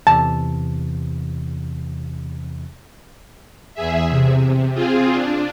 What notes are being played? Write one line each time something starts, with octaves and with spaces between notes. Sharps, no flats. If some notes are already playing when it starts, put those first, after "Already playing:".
E2 C3 E3 A5
E2 G#4 E5
C3
C4 F4 G#4
D4